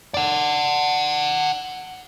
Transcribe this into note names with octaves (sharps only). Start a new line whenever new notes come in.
D5 F#5